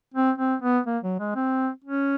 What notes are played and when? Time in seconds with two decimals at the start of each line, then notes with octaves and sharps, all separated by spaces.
0.14 C4
0.38 C4
0.62 B3
0.87 A#3
1.04 F#3
1.20 G#3
1.35 C4
1.84 C#4